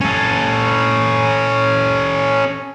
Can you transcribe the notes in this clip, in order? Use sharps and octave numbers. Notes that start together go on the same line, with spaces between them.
C#4 A4